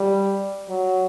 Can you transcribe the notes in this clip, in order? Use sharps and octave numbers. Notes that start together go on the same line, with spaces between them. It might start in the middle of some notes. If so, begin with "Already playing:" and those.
Already playing: G3
F#3